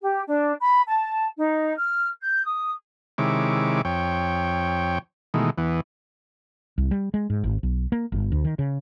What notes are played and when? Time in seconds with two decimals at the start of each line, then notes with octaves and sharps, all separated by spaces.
0.02 G4
0.27 D4
0.60 B5
0.87 A5
1.36 D#4
1.77 F6
2.21 G6
2.44 D#6
3.18 C3 D#3 G#3 E4 C#5 D6
3.85 F2 C#5 G5
5.34 B2 D#3 E3 G#3 A3
5.58 E2 E3 B3
6.78 C2
6.91 G3
7.14 G#3
7.30 G#2
7.44 G#1
7.63 B1
7.92 A#3
8.12 G1
8.32 D2
8.45 D#3
8.59 C#3